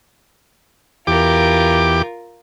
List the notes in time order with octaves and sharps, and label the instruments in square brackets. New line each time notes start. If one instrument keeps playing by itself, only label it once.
[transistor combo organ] E2 G4 D6 [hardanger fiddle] F4 A#4